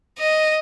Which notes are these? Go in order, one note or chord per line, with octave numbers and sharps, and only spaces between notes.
D#5